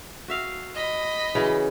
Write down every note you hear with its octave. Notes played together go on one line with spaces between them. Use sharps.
F#4 E5 F5
D#5 B5
C#3 E3 F#3